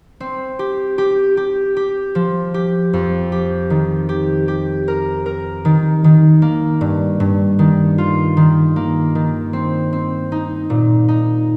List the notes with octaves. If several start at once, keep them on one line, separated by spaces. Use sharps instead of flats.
C4
G4
G4
G4
G4
F3
G4
F2
G4
D#3
G4
G4
A#4
A#4
D#3
D#3
A#3
G2
G2
D#3
F4
D#3
A#3
D#3
C4
C4
D#4
A#2
D#4